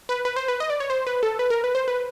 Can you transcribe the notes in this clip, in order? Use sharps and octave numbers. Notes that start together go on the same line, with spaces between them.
B4
B4
C5
B4
D#5
D5
C#5
C5
B4
A4
B4
A#4
B4
C5
B4